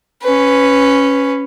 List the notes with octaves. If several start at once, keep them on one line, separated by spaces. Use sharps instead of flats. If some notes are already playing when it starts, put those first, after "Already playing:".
C#4 B4